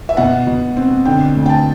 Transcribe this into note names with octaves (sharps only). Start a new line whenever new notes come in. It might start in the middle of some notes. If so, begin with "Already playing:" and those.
E5
B2 F#5
B2
C4
D3 G5
D2
G5
A5